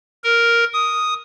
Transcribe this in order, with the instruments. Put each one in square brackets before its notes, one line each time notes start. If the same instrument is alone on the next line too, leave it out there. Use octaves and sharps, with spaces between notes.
[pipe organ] A#4
D#6